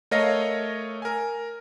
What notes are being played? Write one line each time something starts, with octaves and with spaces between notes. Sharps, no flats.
A3 A#4 C#5 D#5 F5 A#6
A#4 G#5